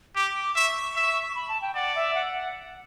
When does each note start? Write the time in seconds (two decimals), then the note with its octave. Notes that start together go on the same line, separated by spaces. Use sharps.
0.16 G4 D6
0.56 E5 C#6
0.95 E5
1.28 C#6
1.35 B5
1.49 A5
1.62 G5
1.75 D5 F#5
1.95 E5
2.15 F#5